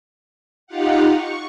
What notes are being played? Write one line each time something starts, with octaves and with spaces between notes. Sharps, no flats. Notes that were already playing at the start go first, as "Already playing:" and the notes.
D#4 F4 G4 F5 F#5
C#6